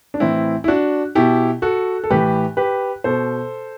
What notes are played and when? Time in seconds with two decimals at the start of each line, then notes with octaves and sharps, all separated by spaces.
0.14 D4
0.20 A2 E3 C4 E4
0.64 E4
0.68 D4 F#4
1.15 B2 E4 G4
1.62 F#4 A4
2.04 A4
2.10 A2 E3 G4 B4
2.57 G4 B4
3.04 B2 A4 C5